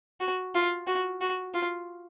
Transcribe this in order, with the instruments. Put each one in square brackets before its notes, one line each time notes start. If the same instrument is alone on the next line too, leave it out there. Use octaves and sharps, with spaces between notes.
[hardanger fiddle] F#4
F4
F#4
F#4
F4